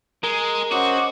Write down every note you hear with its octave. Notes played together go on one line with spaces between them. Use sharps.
G#3 A#4
C#4 F#4 C5 D#5 F#5 C#6 D6